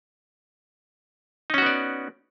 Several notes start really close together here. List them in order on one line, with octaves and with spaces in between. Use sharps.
D#4 C#4 F#4 B3 D5